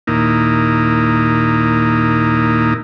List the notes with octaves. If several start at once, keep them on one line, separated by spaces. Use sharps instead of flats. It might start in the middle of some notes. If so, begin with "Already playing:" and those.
D#2 A#2 A#3 D#4 E4